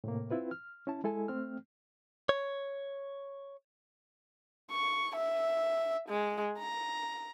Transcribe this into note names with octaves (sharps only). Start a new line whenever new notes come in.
A2 C3 A#3
C4 E4 F4 B4
F6
C#4 E4 A5
G#3 E4 A4 G#5
A3 C4 F6
C#5
C#6
E5
G#3
A#5